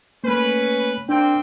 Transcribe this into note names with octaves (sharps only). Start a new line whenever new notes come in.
A3 A#3 C#4 B4
A#3 C4 D4 G5